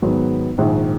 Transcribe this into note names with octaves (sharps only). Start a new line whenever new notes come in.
G#2 D#3 F#3 B3
A#1 G#2 D#3